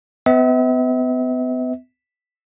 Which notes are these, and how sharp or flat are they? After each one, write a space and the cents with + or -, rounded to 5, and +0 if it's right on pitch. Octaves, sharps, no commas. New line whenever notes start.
B3 +35 E5 -40